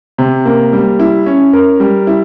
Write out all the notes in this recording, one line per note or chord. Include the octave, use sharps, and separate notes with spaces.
C3
A#3
G3
E4
C#4
A#4
G3
E4